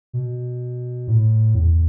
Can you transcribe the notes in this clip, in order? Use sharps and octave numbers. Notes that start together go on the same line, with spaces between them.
B2
A2
E2